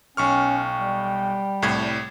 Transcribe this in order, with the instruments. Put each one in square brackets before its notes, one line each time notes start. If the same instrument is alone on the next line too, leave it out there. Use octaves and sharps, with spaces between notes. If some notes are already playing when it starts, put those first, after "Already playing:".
[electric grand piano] B1 C#6 F6 [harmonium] C#4 [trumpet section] G5
[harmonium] G3
[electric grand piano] C2 A2 G#6